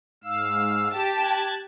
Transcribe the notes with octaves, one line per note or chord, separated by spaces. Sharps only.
G#2 F5 E6
G4 A5
F#6 G#6 A6